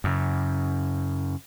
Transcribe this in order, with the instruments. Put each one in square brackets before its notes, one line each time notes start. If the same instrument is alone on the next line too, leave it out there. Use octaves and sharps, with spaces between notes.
[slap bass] F#2 C#3